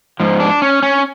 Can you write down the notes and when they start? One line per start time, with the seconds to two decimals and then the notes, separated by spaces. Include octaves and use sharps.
0.20 G#2 F3
0.40 D4
0.62 C#4
0.83 C#4